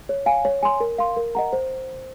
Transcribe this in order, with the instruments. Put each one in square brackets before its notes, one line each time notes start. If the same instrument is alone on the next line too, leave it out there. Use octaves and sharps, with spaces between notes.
[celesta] C#5
F5 G#5
C#5
G#5 C6
A#4
F5 C6
A#4
D#5 F#5 A#5
C5